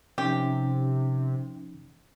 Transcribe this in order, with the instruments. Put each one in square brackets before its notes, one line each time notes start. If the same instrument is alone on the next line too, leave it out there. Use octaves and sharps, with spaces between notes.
[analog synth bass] C3 [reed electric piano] F3 C#4 D#4 [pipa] G4